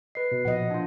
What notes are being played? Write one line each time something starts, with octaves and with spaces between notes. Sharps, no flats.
B4 D#5 C7
B2
A#2 F3 D#5 F#5
D4 F4